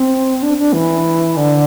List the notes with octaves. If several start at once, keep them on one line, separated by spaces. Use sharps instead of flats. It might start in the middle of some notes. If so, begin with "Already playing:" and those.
Already playing: C4
D4
D4
E3
D3